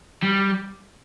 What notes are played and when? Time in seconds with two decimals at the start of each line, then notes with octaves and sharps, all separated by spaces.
0.23 G3